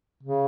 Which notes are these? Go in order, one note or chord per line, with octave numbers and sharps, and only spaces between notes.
C#3